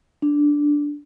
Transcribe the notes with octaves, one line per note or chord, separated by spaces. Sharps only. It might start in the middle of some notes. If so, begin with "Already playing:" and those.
D4